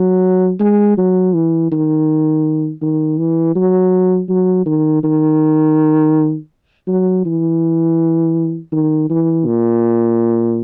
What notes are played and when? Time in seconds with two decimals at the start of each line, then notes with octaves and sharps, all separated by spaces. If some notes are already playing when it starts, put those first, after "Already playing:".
Already playing: F#3
0.60 G#3
0.98 F#3
1.34 E3
1.71 D#3
2.82 D#3
3.18 E3
3.55 F#3
4.29 F#3
4.66 D#3
5.03 D#3
6.88 F#3
7.25 E3
8.72 D#3
9.10 E3
9.46 A#2